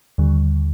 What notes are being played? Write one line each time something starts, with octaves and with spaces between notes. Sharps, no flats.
D#2 D3 G3